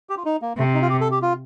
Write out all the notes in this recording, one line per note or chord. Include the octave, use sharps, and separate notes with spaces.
G4
F4
D#4
A#3
C3 A3
D#4
F4
G4
A4
G4
F4